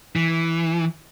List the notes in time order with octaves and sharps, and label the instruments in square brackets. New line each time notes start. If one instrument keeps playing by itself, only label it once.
[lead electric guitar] E3